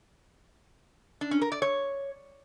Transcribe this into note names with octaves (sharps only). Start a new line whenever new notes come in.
D4
C#4
A#4
D5
C#5